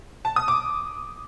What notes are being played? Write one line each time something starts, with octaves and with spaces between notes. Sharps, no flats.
A5
D#6
D6